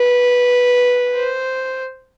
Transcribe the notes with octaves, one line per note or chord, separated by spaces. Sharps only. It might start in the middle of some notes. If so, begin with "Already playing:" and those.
Already playing: B4
C5